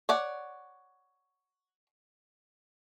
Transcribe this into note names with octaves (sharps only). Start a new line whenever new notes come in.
C#5 D5 F#5